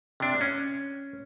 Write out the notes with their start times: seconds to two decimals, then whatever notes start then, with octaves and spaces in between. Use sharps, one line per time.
0.20 C3 D4
0.41 C#4